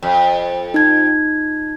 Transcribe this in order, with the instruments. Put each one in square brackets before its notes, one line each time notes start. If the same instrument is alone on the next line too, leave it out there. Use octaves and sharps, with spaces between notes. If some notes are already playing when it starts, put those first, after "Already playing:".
[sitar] F2
[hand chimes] D#4 G#6